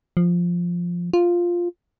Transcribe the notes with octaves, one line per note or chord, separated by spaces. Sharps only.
F3
F4